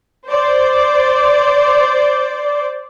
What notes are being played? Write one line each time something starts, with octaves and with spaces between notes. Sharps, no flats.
C5 D5